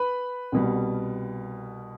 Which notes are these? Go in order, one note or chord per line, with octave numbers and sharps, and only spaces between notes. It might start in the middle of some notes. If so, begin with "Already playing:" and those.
Already playing: B4 B5
C2 B2 G3